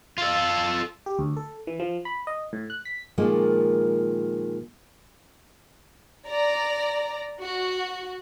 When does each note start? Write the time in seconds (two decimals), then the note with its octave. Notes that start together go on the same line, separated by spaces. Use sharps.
0.18 F4 A4
1.06 G4
1.19 D2
1.37 A4
1.67 E3
1.80 F3
2.05 B5
2.27 D#5
2.53 A2
2.70 F#6
2.85 B6
3.18 A#2 D#3 F3 G#3 A#3
6.26 D5 A#5
7.41 F#4